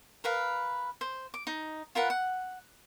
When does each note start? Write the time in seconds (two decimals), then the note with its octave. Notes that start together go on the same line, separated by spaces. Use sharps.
0.24 A#4 B4 F5
1.01 C5
1.34 D6
1.47 D#4
1.95 F4 A#4 B4 F#5
2.10 F#5